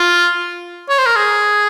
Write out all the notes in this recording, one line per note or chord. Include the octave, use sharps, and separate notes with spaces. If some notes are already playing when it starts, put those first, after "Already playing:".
Already playing: F4
C#5
C5
A#4
G#4